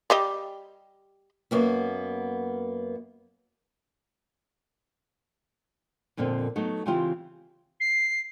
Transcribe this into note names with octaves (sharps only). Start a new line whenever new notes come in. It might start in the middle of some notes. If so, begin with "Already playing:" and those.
G3 G4 D#5
F#2 A#3 B3
F2 A#2 D3 A#3 C4
F#3 A3 B3 D#4
C#3 E3 C4 E4 F4 G4
C7